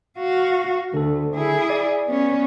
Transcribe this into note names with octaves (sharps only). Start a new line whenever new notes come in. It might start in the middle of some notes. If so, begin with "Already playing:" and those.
F#4 F5
D2 D3 A4
E4 G#4
D5
B3 C#4